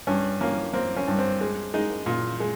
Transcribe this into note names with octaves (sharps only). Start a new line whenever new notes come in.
G2 C#4
A#3 C#4
A#3 C4
C#4
G2
C4
G#3
G#3 D#4
A#2
G#3